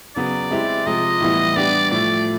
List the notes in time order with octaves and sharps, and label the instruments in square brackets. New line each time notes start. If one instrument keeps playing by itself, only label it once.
[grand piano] C#3 F#3 B3 [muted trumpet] D5
[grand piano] G#3 C4 E4 G4
[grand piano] C3 F3 G#3 [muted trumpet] D#5
[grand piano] A2 E3 G3 B3 E4
[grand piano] G3 B3 D4 G4 [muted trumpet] D5
[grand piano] A2 F3 A3 [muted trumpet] D5